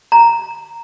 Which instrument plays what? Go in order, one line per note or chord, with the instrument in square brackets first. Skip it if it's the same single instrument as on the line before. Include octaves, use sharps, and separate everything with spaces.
[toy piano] A#5